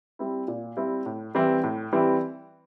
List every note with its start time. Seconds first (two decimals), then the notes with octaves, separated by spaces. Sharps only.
0.19 G3 C4 E4
0.48 A#2
0.77 G3 C4 E4
1.06 A2
1.35 E3 G3 C4 E4
1.64 A2
1.92 E3 G3 C4 E4